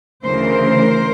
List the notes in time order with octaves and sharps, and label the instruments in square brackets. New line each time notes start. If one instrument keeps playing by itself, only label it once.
[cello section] D2 C#3 E3 A#4 C5